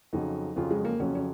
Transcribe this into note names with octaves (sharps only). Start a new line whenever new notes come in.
F2 C#3 F#3 D#4
F2 C#3 F#3 F4
G#3
A#3
F2 C#3 F#3 C#4
C#4